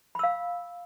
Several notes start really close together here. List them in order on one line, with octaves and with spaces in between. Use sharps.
B5 E6 F5